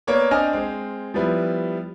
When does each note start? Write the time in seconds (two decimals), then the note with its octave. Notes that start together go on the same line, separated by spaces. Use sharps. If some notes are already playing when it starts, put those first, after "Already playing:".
0.07 A#3 B3 C#5 D5
0.31 C4 D4 D#5 G#5 F6 F7
0.53 G#3 C4
1.14 F3 G3 B3 E4